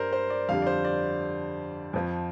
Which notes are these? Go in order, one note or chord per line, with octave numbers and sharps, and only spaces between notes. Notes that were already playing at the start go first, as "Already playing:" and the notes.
Already playing: G2 G3 A#4 C5 D5
C5
D5
F2 D3 G3 F5
D5
C5
D5
F2 F3